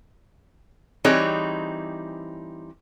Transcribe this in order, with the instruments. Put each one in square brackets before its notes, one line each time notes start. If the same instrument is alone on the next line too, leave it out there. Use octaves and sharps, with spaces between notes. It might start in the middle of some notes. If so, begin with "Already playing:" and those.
[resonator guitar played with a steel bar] E3 G3 C4 D#4 G#4 C#5